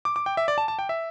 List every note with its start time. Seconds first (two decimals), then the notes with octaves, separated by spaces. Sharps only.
0.05 D6
0.16 D6
0.26 G5
0.37 E5
0.48 D5
0.58 A5
0.68 A5
0.79 G5
0.89 E5